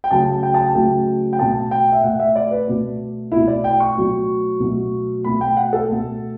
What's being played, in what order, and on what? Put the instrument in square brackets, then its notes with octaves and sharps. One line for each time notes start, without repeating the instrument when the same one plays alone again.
[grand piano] G5
C#3 F#3 A3 A5
G5
A5
G5
C#3 F#3 A3
G5
B2 A3 A5
G5
E5
B2 A3 F#5
E5
D5
B4
B2 A3
B2 A3 E4
D5
G5
C#6
B2 F#3 A3
B2 F#3 A3
B2 A3 B5
G5
F#5
A4
B2 A3